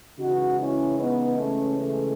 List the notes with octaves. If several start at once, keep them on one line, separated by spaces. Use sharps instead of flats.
C#3 E3 G#3 D#4 F#4
C#4 E4
B3 D#4
A3 C#4
A3